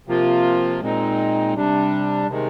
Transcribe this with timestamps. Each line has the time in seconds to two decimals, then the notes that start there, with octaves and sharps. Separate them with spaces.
0.07 C3 F3 A#3 F4
0.80 A#2 G#3 C4 D#4
1.54 C3 G3 D4
2.28 C3 D#3 G#3